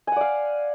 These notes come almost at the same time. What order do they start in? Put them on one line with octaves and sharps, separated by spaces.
G#5 F#5 D5 F5